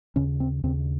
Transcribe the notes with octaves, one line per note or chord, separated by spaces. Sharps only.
D#2 C#3 C#4
C4
D#2 C#3 C4